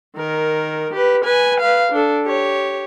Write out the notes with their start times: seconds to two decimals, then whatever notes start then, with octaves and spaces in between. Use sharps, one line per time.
0.16 D#3 A#4
0.93 G4 B4
1.24 B4 G#5
1.60 B4 F5
1.92 D4 A4
2.25 G4 C#5